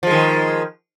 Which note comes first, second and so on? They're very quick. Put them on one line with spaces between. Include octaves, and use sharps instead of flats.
F3 G#3 D#3